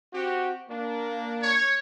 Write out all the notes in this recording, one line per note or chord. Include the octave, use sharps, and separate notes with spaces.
C4 F#4 G4
A#3 D4
C#5